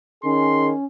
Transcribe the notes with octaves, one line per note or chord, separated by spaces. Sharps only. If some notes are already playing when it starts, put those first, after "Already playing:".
D#3 C#4 G#4 C6